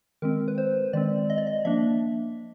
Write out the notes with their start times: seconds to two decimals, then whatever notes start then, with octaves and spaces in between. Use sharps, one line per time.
0.22 D#3 G#3 C4 A#4
0.48 B4
0.58 C5
0.93 D#3 G#3 C4 D5
1.30 D#5
1.38 D5
1.47 D#5
1.65 F3 A#3 D4 E5